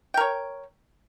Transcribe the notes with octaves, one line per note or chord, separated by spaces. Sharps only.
A#4 C#5 G5